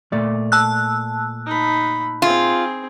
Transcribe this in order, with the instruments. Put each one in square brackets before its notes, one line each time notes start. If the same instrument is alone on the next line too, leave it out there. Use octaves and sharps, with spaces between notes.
[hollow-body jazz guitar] A#2 A3 D5
[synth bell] A5 E6 F#6
[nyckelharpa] D#4 B5
[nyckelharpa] C4 G#4 [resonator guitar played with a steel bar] F4